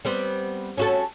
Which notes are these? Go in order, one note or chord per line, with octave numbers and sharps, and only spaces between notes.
G3 B3 C4
C#4 F#4 A4